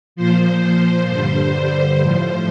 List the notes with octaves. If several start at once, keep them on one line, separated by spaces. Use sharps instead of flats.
A#2 F3 C5
G2 D3 G3
A2 F3 C5